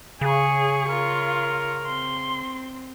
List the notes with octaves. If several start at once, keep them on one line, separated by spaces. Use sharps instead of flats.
C#3 G#4 C#5 C#6
F4 A#4
C4 C6